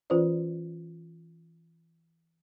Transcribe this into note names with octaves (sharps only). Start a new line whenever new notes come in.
E3 C#4 F4 B4 C5 D5